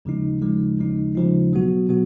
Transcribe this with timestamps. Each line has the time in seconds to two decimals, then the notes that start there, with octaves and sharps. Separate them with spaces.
0.05 D#2 C#3 F3 G#3 D#4
0.42 D#2 C#3 F3 G#3 D#4
0.78 D#2 C#3 F3 G#3 D#4
1.15 D#2 C#3 F3 G#3 D#4
1.52 B2 F#3 B3 F#4
1.89 B2 F#3 B3 F#4